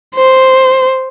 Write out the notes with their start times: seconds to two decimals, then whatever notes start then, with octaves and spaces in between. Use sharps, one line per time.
0.15 C5